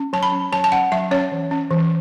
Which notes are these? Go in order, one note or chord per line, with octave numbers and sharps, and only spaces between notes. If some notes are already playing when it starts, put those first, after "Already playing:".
Already playing: C#4
F#3 A5
B5
C#4
F#3 A5
A5
C#4 F#5
F#3 E5
C#4 C#5
E3
C#4
E3